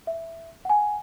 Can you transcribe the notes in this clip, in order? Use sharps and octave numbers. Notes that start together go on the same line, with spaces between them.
E5
F#5 G#5